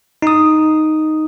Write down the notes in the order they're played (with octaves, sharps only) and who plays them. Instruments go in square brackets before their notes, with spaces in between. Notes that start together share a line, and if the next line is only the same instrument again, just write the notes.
[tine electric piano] D#4 D#6